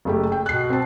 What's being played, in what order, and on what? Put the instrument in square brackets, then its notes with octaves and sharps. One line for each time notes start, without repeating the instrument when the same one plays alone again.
[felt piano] F#1 A3 G4
G5
[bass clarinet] B2 [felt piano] F#6 C7
[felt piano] C4 A5